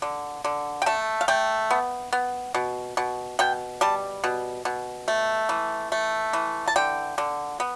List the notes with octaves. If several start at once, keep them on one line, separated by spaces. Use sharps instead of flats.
D3
D3
G5
A3 A5
F5
A3 G5
B3
B3
B2
B2
B2 G5
G3 A5
B2
B2
A3
E3
A3
E3
A5
D3 G5
D3
B3